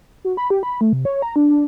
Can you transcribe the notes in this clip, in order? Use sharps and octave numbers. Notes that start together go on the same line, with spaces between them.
F#4
B5
G4
B5
A3
C3
C#5
A#5
D4
D4